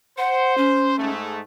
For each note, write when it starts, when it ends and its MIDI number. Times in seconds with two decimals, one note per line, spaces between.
0.18 0.97 72
0.18 0.55 78
0.58 1.10 61
0.97 1.40 44
0.97 1.40 56
0.97 1.40 57